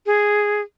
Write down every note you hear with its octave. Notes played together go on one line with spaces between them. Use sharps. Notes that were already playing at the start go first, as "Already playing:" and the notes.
G#4